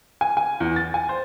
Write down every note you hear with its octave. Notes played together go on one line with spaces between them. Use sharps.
G#5
G#5
E2
A6
G#5
C5